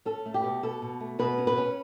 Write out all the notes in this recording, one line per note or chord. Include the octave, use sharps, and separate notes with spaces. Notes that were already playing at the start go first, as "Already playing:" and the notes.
C#4 A4
A3
G4
B2
B2 A4
B2
A3
B2 B4
C#4
B4
C#4